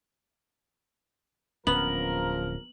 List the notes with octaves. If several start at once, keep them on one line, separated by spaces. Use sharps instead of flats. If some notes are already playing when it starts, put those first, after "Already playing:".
D1 A#1 F3 B3 C#4 A#4 F#7